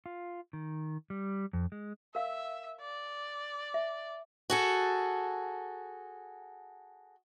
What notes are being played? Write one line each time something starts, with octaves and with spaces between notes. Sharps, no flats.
F4
D#3
G3
F2
G#3
A#4 E5 F5 E6
D5
E5
F#4 G#4 A4